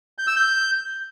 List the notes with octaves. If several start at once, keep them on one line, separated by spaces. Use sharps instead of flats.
G6
E6
G6